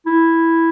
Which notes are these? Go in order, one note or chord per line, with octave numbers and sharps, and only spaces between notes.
E4